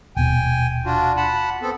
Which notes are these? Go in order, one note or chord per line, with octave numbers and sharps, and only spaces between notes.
D#1 B2 G5 G#5
D4 F4 F#4
F#5 A5 B5
B3 C4 A4